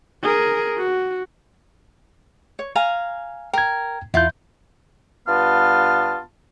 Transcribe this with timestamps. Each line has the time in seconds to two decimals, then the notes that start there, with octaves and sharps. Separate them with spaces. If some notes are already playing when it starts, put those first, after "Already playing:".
0.23 G#4 A#4
0.77 F#4
2.59 C#5
2.76 F5 G#5 A#5
3.54 A#4 G5 G#6
4.14 E2 E4 F4 G6
5.28 G2 B3 F4 A5 F6